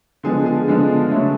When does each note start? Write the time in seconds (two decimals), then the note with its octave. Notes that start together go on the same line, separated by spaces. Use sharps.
0.23 D3 F3 G#3 B3 G#4
0.46 G#4
0.68 D3 F3 G#3 B3
1.11 D3 F#3 A3